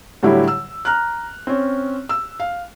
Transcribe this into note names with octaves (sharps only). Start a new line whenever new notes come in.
A2 D3 F#3 G3 E4 G4
E6
A#5 F6 F#6
C4 C#4
E6
F5